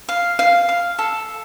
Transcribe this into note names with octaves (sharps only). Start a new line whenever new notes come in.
F5
F5
F5
A4